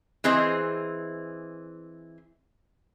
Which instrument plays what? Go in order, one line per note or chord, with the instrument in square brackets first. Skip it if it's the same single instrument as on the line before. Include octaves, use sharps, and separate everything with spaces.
[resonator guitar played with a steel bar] E3 C4 G#4 C5 D#5